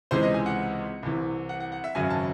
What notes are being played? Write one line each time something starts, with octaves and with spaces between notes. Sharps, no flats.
C#2 C3 E3 G#3 C5
D#5
G#5
F#5
C2 C3 E3
F#5
F#5
F#5
E5
G#1 F#2 C#3 F#3 G#5
A5